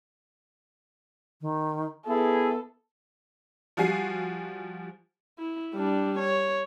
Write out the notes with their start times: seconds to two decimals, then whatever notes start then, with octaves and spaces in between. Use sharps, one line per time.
1.41 D#3
2.06 B3 E4 G#4 A4
3.77 F3 G3 F#4 G#5 C7
5.39 E4
5.75 G3 D4
6.19 C#5